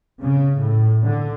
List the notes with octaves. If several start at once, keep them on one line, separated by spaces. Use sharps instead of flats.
C#3
A2
D3